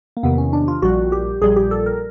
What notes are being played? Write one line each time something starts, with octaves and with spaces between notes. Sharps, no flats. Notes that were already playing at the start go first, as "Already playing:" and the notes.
A#3
E2 C3 D#3 B3
C#4
D4
F4
A#1 A#2 G3 F#4
G4
A#1 A#2 G3 G#4
G4
A4
A#4